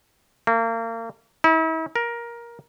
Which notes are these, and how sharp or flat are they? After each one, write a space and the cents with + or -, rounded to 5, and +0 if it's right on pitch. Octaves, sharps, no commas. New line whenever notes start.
A#3 -35
E4 -40
A#4 +15